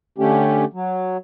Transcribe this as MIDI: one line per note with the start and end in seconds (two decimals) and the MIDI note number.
0.18 0.65 50
0.18 0.65 57
0.18 0.65 61
0.18 0.65 67
0.73 1.17 54